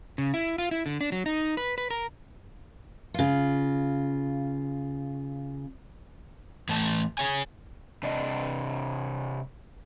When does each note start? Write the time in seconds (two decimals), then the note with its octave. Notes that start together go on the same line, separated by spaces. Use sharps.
0.18 C#3
0.34 E4
0.58 F4
0.71 E4
0.86 D3
1.01 D4
1.12 F#3
1.26 D#4
1.57 B4
1.78 B4
1.90 A#4
3.14 C#3 F4
6.69 A2 E3 A3 A5
7.18 G#4 C#5 G#5
8.03 C3 D4 D#5